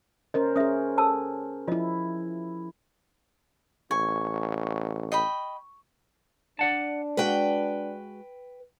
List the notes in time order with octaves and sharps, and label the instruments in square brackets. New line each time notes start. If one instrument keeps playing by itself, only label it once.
[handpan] C#4 A#4 C5 [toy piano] D#5
[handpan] C#4 G#4 [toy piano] E5 D#6
[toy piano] A4 A5 E6
[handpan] F3 E4 [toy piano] F4 D#5
[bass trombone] A1 [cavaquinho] G#5 [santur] C#6
[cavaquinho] D#5 G5 B5
[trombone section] D4 [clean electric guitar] D5 F#5 A5
[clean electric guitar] G#3 F#4 [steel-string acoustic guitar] B4 G5